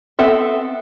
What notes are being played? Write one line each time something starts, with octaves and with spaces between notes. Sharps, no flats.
B3 C4 A4 E5